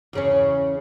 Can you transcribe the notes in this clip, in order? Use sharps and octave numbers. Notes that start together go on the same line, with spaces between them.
E2 C#3 C#4